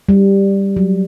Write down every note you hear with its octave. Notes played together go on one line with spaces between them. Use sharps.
G3
F#3